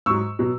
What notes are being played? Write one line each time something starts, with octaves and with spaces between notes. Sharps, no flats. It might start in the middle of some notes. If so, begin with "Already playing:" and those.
G#2 F#3 C#6 E6
B2 F#3